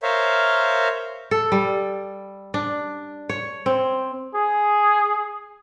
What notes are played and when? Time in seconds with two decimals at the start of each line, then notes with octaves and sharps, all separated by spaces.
0.03 A#4 C5 C#5 E5 F5
1.31 A4
1.52 G3
2.54 D4
3.29 C#5
3.66 C4
4.35 G#4